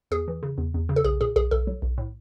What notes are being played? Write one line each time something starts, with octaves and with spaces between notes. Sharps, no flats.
E2 G#4
E3
C#3
E2
E2
C#3
A4
B1 G#4
A#2 G#4
B1 G#4
B1 A4
F#3
B1
A2